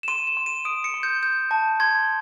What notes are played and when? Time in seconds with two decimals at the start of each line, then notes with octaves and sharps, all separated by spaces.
0.03 E7
0.08 C6 D#7
0.27 E7
0.37 C6
0.46 D#7
0.65 D#6 D7
0.84 C#7
0.94 C6
1.03 G6
1.23 G6
1.51 A5
1.80 C6 G#6